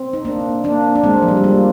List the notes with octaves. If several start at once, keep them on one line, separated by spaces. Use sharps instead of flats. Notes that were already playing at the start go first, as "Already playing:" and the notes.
Already playing: C4
D#4
A#3 D4
A#3 D4
D4
G#3 C4
F3
G3
G#3
G3 A#3